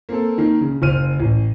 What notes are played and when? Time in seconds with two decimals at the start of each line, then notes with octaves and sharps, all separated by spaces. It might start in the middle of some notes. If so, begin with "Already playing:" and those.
0.09 A#3 C4 A4
0.38 D#3 A#3
0.61 C#3
0.82 F#1 C5 F6 D#7
1.20 A1